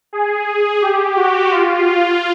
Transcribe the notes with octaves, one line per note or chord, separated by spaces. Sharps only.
G#4
G#4
G4
F#4
F4
F4